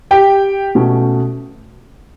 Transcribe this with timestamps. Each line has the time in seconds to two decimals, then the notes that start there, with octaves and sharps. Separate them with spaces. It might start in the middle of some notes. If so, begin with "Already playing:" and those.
0.11 G4 G5
0.75 B2 A3 C#4